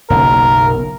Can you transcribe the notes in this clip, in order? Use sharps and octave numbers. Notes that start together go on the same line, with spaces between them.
F#1 B1 A#4